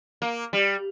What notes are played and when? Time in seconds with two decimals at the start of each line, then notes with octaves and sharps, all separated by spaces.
0.22 A#3
0.53 G3